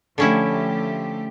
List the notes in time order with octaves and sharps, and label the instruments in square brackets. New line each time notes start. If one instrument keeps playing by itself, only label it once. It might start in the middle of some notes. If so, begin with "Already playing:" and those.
[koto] D3 C#4 E4 [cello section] F3 A3 G4